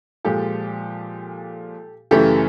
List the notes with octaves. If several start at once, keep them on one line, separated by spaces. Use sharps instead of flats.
A#2 F3 G#3 G4 A4
F#2 C#3 E3 A3 G4 A4